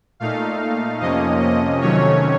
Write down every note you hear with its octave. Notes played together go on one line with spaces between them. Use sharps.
A#2 A3 D#4 F5
F2 C3 F3 A#3 C#4 D#5
D#5
C3 D#3 F#3 A3 C#4 C#5